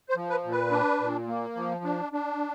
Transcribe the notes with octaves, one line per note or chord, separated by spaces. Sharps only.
C5
F3
B4
A#2
B4
D4
A#2
A#3
F3
D4
D4